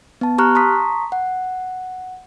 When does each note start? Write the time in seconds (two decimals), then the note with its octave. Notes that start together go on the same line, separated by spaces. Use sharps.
0.21 B3 A5
0.38 G4 A#5 C#6 F6 F#6
0.55 A5 A#5 C6 C#6 D#6 B6
1.12 F#5